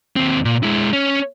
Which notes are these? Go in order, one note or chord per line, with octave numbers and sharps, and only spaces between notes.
D#2 C4
A#2
G#3 E4
C#4